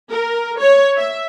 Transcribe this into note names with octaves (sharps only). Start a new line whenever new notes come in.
A#4
C#5
E5